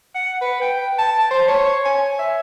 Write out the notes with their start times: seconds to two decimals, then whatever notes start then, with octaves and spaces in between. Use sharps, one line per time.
0.15 F#5
0.41 B4
0.61 G5
0.99 A5
1.31 C5
1.48 C#5
1.85 G#5
2.19 E5